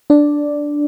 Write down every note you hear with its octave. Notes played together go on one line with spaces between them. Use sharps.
D4 D5